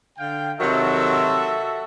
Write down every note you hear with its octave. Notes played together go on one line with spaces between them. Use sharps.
D3 F5 G5
C3 D#3 F#3 F#4 A4 E5